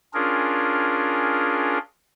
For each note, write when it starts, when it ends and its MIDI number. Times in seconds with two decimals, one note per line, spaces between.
0.14 1.78 61
0.14 1.78 62
0.14 1.78 65
0.14 1.78 68
0.14 1.78 70